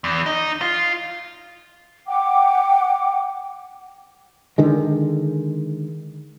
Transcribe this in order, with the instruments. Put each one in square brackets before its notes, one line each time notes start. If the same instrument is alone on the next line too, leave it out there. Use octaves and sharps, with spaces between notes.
[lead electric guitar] E2
D#4
F4
[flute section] F#5 G5 D6
[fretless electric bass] D3 D#3 G#3